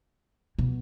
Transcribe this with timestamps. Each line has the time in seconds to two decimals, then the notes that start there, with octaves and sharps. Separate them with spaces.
0.59 B2